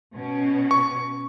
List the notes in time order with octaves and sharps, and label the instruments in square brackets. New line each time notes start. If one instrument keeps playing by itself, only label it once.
[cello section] B2 C#4
[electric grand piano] C#6